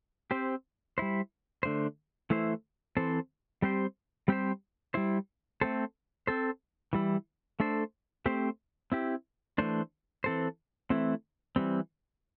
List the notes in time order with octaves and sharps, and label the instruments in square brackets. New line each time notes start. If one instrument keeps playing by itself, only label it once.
[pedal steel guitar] C4 G4 C5
G3 E4 C5
D3 A3 D4 C5
E3 A3 E4 C5
E3 C4 A4 C5
G3 C4 G4 C5
G3 C4 G4 C5
G3 E4 C5
A3 C4 A4 C5
C4 A4 C5
E3 G3 E4
A3 D4 A4 C5
A3 C4 G4 C5
C4 E4 G4
E3 A3 D4 C5
E3 C4 A4 C5
E3 A3 C4 E4
E3 G3 C4